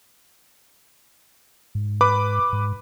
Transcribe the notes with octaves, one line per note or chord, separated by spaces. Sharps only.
G#2
B4 B5 D6
G#2